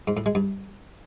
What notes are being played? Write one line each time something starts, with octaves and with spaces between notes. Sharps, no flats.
G#2
A2
G#3
G2